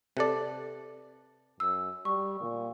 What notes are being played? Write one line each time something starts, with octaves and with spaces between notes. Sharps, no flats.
C3 A4 B4 D5
F#2 E6
G3 C#6
A#2